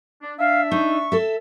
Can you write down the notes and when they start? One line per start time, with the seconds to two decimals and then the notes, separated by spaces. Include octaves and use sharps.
0.22 D4
0.39 D4 E5 F5
0.71 D#4 C#6
1.12 A4 E5